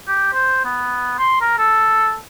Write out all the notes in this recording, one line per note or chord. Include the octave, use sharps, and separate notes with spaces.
G4
C5
B3
C6
A#4
A4